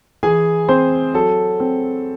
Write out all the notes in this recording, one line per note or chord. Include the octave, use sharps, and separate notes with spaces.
E3 G#4 G#5
C4 C5
F#3 A4
C4